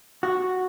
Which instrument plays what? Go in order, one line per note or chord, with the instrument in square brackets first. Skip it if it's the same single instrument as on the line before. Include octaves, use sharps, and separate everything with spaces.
[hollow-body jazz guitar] F#4